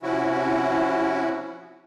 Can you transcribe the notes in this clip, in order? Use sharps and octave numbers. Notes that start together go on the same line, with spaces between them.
C3 F3 C#4 E4 F#4